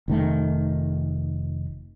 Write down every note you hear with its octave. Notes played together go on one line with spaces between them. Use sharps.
F1 D#3 A3